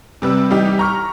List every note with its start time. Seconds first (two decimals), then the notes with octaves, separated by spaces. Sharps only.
0.22 C3 G3 B4 E6
0.50 E3 G3 D#4 G4
0.79 A#5 C#6 F6